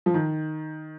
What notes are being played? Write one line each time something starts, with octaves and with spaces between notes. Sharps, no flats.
F3
D#3